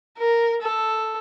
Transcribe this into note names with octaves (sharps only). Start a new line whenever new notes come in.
A#4
A4